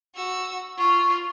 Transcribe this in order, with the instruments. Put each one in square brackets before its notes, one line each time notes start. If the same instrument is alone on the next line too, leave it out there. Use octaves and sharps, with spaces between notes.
[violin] F#4 E6
[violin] F4 [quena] C#6